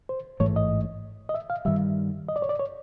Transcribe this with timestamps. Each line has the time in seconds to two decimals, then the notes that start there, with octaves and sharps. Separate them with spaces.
0.09 C5
0.40 A1 G#2 E3 A3 C#5
0.56 D#5
1.29 D#5
1.34 E5
1.50 F5
1.65 G2 D#3 G3 E5
2.29 D#5
2.36 D5
2.42 C#5
2.49 D5
2.60 C#5